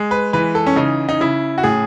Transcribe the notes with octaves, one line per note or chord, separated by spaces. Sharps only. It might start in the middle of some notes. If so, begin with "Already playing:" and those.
Already playing: G#3
B4
E3 B4
A4
C#4
C#3 D#4
D#4
C#3 E4
F#4
A2 G#4